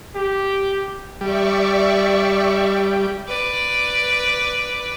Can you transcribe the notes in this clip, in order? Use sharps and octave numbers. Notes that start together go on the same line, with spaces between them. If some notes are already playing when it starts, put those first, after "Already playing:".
G4
G3 D5 E5 C#6
B4 D5